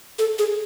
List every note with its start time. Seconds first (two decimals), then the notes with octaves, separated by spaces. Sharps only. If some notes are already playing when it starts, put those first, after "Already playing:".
0.19 A4
0.39 G#4